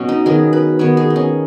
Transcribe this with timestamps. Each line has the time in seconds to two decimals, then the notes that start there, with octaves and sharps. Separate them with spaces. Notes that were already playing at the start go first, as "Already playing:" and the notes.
Already playing: B2 F#3 B3 C#4
0.09 D#4
0.26 D#3 F#3 B3 G#4
0.53 B4
0.79 D#3 B3 C#5
0.97 G#4
1.10 D#4
1.16 C#4